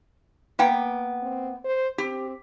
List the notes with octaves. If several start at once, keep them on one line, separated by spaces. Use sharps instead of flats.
A#3 B3 G5
C4
C5
C4 G4